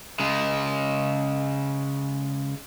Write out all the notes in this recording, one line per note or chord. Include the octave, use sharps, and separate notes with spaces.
C#3 G#3